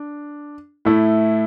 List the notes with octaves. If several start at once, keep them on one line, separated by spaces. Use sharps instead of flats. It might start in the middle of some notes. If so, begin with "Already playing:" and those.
Already playing: D4
A2 A3 E4